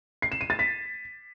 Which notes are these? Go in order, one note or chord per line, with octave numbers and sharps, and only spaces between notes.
C7
E7
D#7
A6
B6